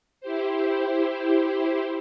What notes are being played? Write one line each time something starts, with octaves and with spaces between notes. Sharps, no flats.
E4 G4 C5